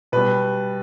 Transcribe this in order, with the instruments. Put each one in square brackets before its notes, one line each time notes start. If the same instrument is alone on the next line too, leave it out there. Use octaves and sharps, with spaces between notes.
[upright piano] B2 G3 B4